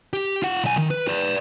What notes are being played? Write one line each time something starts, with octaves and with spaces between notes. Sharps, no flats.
G4
F4 F#5
B1 G#5
D#3
B4
B4 D5